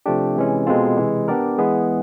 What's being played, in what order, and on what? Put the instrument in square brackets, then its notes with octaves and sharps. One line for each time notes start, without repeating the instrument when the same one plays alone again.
[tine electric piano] C3 F3 A3 D4 G4
C3 E3 G#3 C#4
B2 G#3 C4 F4 A4
C3 E3 G#3
B3 D4 G4 A#4 D5
E3 G#3 B3 E4 G#4